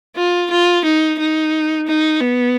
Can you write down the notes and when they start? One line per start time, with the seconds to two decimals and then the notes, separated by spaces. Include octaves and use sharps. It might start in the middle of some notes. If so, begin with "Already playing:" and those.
0.16 F4
0.50 F4
0.84 D#4
1.19 D#4
1.87 D#4
2.21 B3